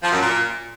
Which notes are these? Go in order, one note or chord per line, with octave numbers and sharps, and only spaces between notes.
F3
F#2
A#2